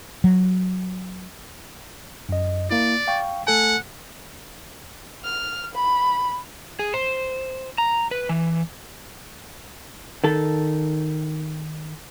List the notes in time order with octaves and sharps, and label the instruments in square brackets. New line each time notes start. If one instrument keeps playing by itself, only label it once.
[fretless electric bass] F#3
[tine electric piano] F#2 D#5
[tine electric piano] A#3 E4 [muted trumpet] D5
[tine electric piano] F5 G5 C#6
[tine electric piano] A3 A4 G#5 [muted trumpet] F#5
[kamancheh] F6
B5
[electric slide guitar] G#4
C5
A#5
B4
E3
[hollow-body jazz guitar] D#3 A4